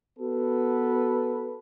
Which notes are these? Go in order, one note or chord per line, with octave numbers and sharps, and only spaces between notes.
B3 F#4 A4 B4